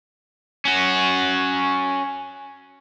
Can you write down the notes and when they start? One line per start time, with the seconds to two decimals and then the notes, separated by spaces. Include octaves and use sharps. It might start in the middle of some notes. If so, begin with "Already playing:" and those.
0.65 C#4 F#4